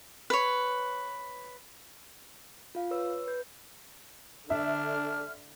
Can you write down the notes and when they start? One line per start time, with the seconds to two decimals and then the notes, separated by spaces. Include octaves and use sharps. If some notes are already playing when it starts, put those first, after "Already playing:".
0.30 B4 C#5
2.75 F4 F5
2.91 B4 C#5 E6
3.27 B4 G6
4.50 D3 D4 E5 F6